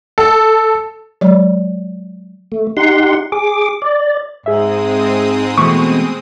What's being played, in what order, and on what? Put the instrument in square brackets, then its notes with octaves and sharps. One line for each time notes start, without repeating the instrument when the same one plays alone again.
[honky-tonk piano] A4
[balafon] F#3 G#3 D5
[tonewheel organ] A3
D#4 G4 F#5 C6
G#4 D6
D5
[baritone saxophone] G#2 [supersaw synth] G#3 C4 D#6 [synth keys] G#4 E5
[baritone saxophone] B2 [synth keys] E3 A3 [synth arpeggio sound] C#6